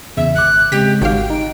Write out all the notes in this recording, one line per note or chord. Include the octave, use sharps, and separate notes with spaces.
E2 C#3 E5
G#1 D6 F#6
C#3 G#3 C4 G4 B6
G#1 F#4 G4 F5 G5
D#4